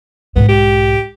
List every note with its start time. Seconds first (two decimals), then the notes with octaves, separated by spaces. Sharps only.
0.36 B1 G#2 B3
0.49 G4